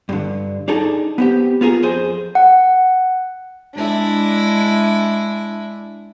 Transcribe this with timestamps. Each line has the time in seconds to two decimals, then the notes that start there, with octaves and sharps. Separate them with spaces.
0.09 G2 D3
0.68 D4 D#4 G#4 A4 A5
1.18 B3 C4 G4
1.61 B3 F4 G#4 A#4
1.83 F2 G#4 C5
2.35 F#5
3.74 G#3 D4 E4